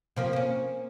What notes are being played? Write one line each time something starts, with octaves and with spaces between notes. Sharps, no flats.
C3 F3 A#3
A#3 C#4